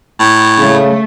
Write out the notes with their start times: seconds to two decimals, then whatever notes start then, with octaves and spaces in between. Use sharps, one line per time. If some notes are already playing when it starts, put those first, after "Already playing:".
0.20 A2
0.59 C#3 A3